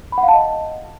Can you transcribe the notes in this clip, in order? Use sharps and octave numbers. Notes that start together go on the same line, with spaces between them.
B5
F#5
F5
A5
D#5